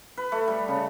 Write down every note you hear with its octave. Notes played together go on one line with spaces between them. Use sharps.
B4
A3
G3
C#3